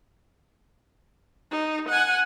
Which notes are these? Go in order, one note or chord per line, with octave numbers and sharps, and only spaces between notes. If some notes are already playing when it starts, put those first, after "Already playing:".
D#4
F#5 G#5